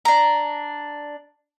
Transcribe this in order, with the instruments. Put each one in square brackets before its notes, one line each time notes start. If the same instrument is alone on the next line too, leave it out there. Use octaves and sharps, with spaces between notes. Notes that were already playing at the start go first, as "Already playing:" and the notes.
[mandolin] D4 A#5